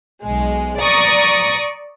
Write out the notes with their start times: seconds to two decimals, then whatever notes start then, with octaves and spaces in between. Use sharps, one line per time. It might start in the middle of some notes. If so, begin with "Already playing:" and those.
0.24 B1 G#3
0.80 D5 A#5 C#6 D#6